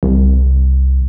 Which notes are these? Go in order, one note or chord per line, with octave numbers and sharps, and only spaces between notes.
C2